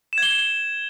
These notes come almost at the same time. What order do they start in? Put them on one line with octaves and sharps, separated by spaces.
E7 G#6 G7